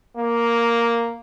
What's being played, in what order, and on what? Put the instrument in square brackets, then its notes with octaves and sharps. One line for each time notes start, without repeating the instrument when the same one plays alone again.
[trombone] A#3